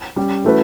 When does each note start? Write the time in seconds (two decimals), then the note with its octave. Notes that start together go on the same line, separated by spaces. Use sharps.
0.16 G3 C#4 G4
0.44 E3 A3 C#4 F#4 B4